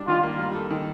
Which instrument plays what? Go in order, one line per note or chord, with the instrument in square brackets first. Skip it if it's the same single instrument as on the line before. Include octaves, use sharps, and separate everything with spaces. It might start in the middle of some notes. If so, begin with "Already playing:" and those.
Already playing: [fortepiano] G3 D4
[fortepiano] D#3 [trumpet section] F4
[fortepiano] A#3
G3
A4
D#3